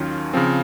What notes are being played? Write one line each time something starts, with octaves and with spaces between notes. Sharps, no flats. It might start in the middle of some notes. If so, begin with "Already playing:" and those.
Already playing: D#2 D#3 F#3 C#4 F4
C#3 F3 C4